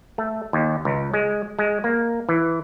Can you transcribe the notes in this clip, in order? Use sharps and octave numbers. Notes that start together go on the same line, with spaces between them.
A3
D#2
C#2
G#3
G#3
A#3
E3